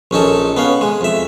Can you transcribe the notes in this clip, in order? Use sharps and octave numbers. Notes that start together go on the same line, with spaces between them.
A#1 C#4 D#4 A4
B3 C#4 F5
G#3
F2 E5